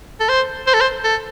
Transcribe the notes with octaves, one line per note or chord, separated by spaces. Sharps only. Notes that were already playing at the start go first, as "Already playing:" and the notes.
A4
C5
C5
A4
C5
A4